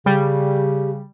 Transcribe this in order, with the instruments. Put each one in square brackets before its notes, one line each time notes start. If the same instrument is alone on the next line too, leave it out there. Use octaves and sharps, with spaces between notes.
[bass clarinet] C#3 [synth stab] G3 [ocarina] G4